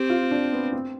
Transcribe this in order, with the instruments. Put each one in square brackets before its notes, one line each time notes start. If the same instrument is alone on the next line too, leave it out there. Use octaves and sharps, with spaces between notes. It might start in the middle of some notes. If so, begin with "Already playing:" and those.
Already playing: [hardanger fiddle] C4 [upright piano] G4
[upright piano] F4
D4
B3
C4